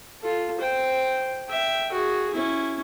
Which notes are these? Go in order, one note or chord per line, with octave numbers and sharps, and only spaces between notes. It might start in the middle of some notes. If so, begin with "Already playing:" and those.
F4 A4
C5 G5
E5 G5
F#4 G#4
C#4 E4